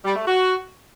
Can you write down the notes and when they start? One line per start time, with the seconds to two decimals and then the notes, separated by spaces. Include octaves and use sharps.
0.05 G3
0.16 A3
0.27 F#4